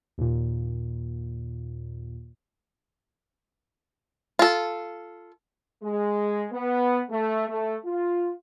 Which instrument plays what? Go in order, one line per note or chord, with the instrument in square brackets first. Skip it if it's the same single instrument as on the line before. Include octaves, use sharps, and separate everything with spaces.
[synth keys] D#2 A#2
[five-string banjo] F4 A4
[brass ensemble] G#3
B3
A3
A3
F4